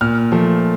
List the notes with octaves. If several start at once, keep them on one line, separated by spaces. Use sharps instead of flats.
A#2 F6
F3 A3